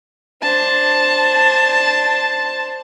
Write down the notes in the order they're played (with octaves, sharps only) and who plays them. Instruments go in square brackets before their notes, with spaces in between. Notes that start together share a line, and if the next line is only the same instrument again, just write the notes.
[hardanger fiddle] D4 C5 [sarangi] A5